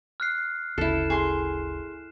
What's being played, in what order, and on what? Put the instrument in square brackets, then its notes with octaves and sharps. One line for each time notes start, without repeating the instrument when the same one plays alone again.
[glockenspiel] F6 F#6 C7
[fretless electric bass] G1 D2 C#3 [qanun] E4 A4 [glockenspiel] C7 E7
[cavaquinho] G#4 C6